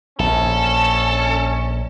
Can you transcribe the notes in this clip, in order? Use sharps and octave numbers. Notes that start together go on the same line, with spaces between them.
A#1 C#4 A4